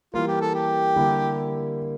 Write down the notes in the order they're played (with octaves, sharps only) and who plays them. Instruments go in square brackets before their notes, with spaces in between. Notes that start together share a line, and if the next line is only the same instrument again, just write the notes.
[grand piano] E3 G3 A#3 [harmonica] F4
[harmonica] G4
A4
G4
[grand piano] D3 G3 A#3 E4